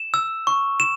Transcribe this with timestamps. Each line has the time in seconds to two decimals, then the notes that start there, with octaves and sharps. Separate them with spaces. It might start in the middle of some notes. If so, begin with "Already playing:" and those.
Already playing: E7
0.14 E6
0.47 C#6
0.80 E7